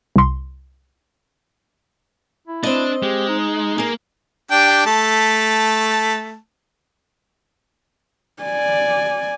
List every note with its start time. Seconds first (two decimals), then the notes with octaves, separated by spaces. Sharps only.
0.16 C2 C6
2.47 E4
2.63 C4 D4 D#5
3.03 G#3 G4
3.29 D#4
3.78 A#3 G#4 A#4
4.51 D4 G4 G5
4.86 A3 A5
8.42 D5 G#5